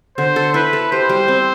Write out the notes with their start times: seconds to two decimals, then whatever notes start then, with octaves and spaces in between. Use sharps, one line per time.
0.17 D3 C5
0.36 A4
0.54 E4 B4
0.73 A4
0.92 G4 C5
1.09 G3
1.28 C4